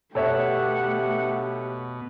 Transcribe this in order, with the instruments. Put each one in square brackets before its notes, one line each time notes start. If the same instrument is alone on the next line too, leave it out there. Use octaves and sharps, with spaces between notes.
[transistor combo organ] B2 [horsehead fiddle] A3 G4 [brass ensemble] B3 F#5 [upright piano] A4 C#5 E5